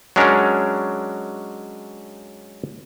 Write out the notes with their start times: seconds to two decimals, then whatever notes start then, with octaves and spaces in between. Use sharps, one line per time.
0.16 F#3 G#3 C#4 D4 A#4